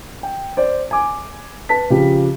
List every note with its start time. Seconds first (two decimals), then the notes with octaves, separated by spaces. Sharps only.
0.23 G5
0.57 C5 D5
0.91 G#5 D6
1.69 B4 A5 B6
1.90 C#3 F3 G4